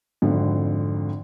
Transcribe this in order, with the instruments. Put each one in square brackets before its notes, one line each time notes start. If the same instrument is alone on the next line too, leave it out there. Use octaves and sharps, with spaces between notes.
[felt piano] G#1 F2 D3